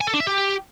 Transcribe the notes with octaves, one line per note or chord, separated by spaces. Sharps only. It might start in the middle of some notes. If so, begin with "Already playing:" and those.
G#5
A4
D4
E5
G4